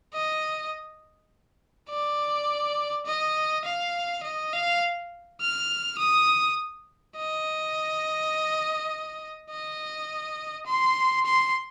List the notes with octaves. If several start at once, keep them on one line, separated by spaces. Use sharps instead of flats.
D#5
D5
D#5
F5
D#5
F5
F6
D#6
D#5
D#5
C6
C6